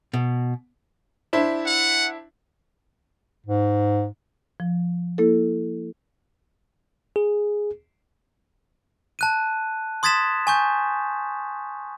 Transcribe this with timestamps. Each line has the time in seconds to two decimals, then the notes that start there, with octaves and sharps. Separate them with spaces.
0.14 B2
1.33 D4 E4 C5
1.66 F#5
3.46 G#2
4.60 F3
5.18 A#3 E4 A4
7.16 G#4
9.19 A5 F#6 D#7
10.03 C6 D#6 G#6 A6 B6 E7
10.47 G#5 C#6 G6